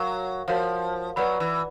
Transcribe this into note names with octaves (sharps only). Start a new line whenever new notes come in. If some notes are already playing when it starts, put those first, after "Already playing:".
Already playing: F#3 F#4 A#4 C#5 F5
F3 F#4 A#4 C#5 F5
F#3 B4 D5 F#5 B5
E3